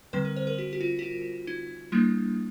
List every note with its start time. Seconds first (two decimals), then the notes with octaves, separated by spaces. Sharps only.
0.13 D3 G3 C4 B4
0.25 A#4
0.36 C5
0.47 A#4
0.58 F#4
0.73 F#4
0.81 F4
0.99 F#4
1.02 F4
1.47 D#4
1.92 G3 A#3 D4 E4